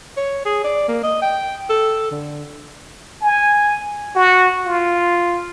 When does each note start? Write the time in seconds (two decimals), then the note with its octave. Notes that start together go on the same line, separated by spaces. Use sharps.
0.17 C#5
0.45 G#4
0.64 D5
0.88 A#3
1.03 D#5
1.22 G5
1.70 A4
2.11 D3
3.22 G#5
4.16 F#4
4.66 F4